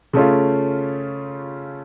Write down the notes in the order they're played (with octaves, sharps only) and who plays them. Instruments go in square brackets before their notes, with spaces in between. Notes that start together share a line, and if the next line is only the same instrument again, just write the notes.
[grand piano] C#3 A3 C#4 F4